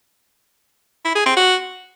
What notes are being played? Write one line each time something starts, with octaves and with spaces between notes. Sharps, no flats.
E4
G#4
C4
F#4